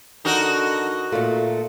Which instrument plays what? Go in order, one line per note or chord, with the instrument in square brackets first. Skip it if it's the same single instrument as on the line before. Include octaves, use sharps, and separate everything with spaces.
[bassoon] D3 [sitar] D#4 F#4 A#4
[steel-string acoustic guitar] A#2 A3 [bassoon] F4